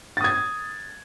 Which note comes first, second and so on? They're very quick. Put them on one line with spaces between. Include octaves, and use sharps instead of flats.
A6 D#6 G#6